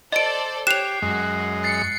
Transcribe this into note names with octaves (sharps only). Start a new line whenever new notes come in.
A4 C5 D5 D#5 D7
G4 C#5 F#6 C7 E7 F7
F#2 G#3 F#4
A6 C7 C#7